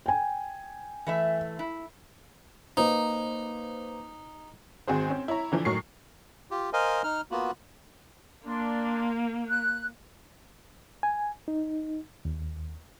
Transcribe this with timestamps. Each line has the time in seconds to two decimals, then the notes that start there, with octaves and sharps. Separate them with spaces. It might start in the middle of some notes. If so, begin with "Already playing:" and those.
0.06 G5 G#5
1.07 E3 A3 E5
1.59 E4
2.77 A#3 D#4 B4 C5
4.87 G#1 C4 F#4 G#4 C5
5.08 C4 C#4
5.28 E4 C#5 A#5
5.52 D3 E3 F3
5.65 A2 F#3 D#4 A#4 C#6 C7
6.51 F4 G4
6.73 A#4 C5 D#5 F5 G#5
7.03 D#4 F6
7.31 A#3 B3 F4 F#4
8.44 A#3 D4 C6
9.48 F#6
11.03 G#5
11.48 D#4
12.25 D#2